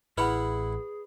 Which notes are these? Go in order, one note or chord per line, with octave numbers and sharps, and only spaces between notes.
A1 E4 G#4 B4 F#5 B5